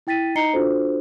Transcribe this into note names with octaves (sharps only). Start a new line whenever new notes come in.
E4 G5 A6 B6 D#7
D#4 D#5 A#5 C7 C#7 G7
D4 F4 F#4 A4 C5